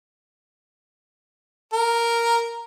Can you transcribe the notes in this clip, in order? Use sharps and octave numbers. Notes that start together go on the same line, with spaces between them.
A#4